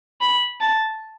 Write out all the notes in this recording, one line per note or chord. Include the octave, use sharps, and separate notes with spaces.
B5
A5